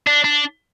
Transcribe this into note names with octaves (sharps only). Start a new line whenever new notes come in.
D4
D4